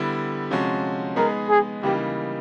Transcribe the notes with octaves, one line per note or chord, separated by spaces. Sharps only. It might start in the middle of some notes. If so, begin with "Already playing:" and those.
Already playing: D3 G3 B3 E4
C3 F3 G#3 C#4 F#4
G#3 B3 D#4 G#4 A#4
G#4
C#3 E3 G3 A#3 D#4 G4